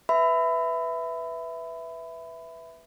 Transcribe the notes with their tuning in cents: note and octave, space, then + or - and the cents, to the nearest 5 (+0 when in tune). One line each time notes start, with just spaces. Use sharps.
B4 +0 E5 +0 B5 +25